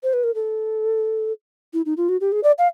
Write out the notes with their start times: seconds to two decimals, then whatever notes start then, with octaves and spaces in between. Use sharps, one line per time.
0.03 C5
0.13 B4
0.24 A#4
0.35 A4
1.74 E4
1.86 D#4
1.97 F4
2.09 F#4
2.21 G4
2.32 G#4
2.44 D5
2.58 F5